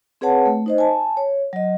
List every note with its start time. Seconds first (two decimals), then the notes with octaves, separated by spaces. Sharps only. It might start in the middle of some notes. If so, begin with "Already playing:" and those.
0.21 C4 G#4 B4 C#5 F#5 A5
0.46 A3
0.66 D#4 C5 D#5
0.78 G#5 A5
1.17 C#5
1.53 F#3 D#5